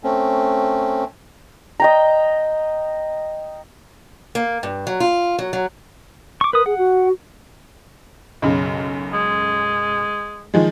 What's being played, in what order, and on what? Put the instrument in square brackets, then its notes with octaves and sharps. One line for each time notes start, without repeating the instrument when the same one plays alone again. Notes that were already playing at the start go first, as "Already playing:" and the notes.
[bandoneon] A3 C4 C#4
[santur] D#5 G5 A#5
[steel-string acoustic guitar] A#3
G2
F#3
F4
F#3
F#3
[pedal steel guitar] C#6 D6
[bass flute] A#4 [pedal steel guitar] B4 D#6
[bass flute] G#4 [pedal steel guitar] F#5
[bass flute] F#4
[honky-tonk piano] B1 F#2 C#3
[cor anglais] G#3
[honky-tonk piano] D#3 F3 G#3